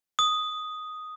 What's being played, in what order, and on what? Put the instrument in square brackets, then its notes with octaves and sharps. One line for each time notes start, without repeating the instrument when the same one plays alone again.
[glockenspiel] D#6